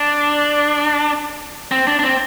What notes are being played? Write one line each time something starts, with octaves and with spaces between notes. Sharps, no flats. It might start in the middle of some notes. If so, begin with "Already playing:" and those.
Already playing: D4
C4
D4
D4
C4